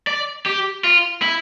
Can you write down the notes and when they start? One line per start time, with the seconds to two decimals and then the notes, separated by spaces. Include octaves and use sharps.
0.07 D5
0.46 G4
0.84 F4
1.22 E4